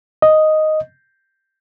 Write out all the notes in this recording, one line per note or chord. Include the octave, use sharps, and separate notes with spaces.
D#5